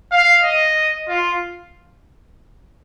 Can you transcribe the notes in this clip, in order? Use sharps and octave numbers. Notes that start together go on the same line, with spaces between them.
F5
D#5
F4